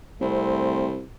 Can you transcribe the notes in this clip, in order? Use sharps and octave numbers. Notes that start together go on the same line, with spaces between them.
C2 A3 C4 C5